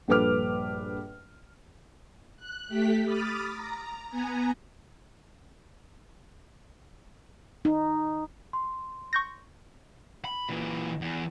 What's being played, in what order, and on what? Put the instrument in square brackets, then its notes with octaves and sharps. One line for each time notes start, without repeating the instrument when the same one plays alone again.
[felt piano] A#1 G2 A4 B4 D6 F6
[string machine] F#6
A3 G4 B6
B5 D6 D#6 F6 A6
A#5
B3 G#5 A#5
[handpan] D#4
[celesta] C6
[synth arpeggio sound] C#6 G6 A#6
[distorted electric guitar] B5
A#2 E3
E2